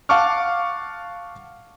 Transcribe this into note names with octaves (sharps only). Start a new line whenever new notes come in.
F5 F#5 A5 C#6 D6 F6